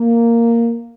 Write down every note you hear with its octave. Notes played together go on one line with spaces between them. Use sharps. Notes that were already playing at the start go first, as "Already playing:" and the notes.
Already playing: A#3